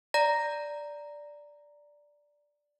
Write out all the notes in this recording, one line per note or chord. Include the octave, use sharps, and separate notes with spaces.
D5 A#5 A#6